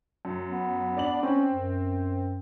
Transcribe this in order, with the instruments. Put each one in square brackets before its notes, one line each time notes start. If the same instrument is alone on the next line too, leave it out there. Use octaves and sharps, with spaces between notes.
[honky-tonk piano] F#2
[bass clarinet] B3
[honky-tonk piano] D4 D5 F#7
[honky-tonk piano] C4 [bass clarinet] C#4
[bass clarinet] F#2